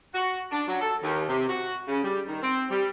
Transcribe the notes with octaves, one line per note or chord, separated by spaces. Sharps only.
F#4
D4
F#3
A4
D#2
C3
F#4
C#3
G3
D#3
C4
G3